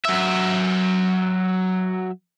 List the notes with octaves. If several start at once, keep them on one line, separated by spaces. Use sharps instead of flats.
F#3 E5